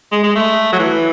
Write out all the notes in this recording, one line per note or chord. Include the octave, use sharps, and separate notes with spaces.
G#3
G#3
A3
F#3
E3